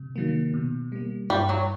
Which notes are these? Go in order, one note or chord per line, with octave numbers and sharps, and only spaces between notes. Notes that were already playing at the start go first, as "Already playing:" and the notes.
Already playing: C3
D#3 F#3 A#3
B2
G3 A#3
G2 G3
F#3